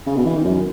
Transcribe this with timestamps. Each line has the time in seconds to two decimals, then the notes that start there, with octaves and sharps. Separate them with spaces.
0.07 C#3
0.16 B2
0.25 E3
0.36 D#3
0.45 F#2